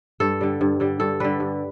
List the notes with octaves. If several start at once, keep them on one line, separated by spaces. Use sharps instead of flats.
G2 A4
D3 G3
G2
D3 G3
G2 A4
D3 G3 B4
G2